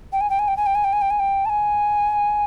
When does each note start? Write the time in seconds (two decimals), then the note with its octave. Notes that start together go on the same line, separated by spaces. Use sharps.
0.12 G5
0.21 G#5
0.30 G5
0.39 G#5
0.48 G5
0.57 G#5
0.66 G5
0.75 G#5
0.84 G5
0.93 G#5
1.01 G5
1.10 G#5
1.19 G5
1.45 A5
1.49 G#5